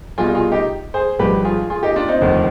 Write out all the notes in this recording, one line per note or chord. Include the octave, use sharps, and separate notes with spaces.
C2 B2 G3 F4 G#4
F4 G#4
D#4 G4
G#4 C5
G#1 G2 F3 G#3 G4 B4
F4 G#4
F4 G#4
D#4 G4
D4 F4
C4 D#4
F1 D#2 D3 F3